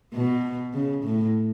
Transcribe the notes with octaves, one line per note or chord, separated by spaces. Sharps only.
B2
C#3
A2